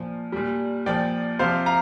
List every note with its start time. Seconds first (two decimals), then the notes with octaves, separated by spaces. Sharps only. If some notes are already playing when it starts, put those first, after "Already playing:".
Already playing: A#2 F3
0.32 A#2 G3
0.86 A#2 F3 D5 G5
1.39 C3 F3 C5 F5
1.66 F5 A#5